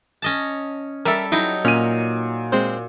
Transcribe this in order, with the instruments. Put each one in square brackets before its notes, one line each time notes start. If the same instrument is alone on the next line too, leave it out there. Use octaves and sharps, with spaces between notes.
[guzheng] C#4 D#5 A5
[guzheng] G3 A4 [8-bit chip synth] A#4 E5
[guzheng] F#3 D#4 [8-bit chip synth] E4
[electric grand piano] A#2 D#7 [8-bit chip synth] C#4 F6
[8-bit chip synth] G#3 C4 C5